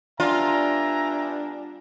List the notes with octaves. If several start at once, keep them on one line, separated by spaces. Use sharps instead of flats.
G3 B3 D4 F4 E5 G#5 A#5